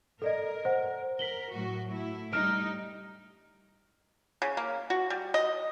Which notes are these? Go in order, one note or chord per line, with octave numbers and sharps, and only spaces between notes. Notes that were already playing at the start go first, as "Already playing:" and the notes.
A4 A#4 D5 D#5
C5 F#5
A#4 B6 F#7 G7
A2 F#3 F#4
A3 E4
G3 D#4 F6 D7
C#3
A#3
F#4
G3
D#5